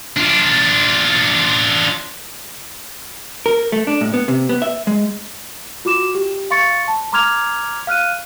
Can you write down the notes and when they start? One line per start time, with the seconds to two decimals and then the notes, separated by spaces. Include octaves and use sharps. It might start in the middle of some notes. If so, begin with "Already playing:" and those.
0.17 D4 F4
3.46 A#4
3.72 A3
3.87 D4
4.01 A2
4.14 B3
4.28 C3
4.49 B3
4.62 E5
4.87 G#3
5.85 F4 F#4 D6 E7
6.15 G4
6.50 F5 C6 C#6 A6 C#7
6.88 A5
7.12 A#5 C6 D6 F6 G#6 F7
7.87 F5 F6 F#6 D#7